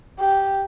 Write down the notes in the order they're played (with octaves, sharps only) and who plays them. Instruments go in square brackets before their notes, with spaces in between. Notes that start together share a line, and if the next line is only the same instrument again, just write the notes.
[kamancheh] G4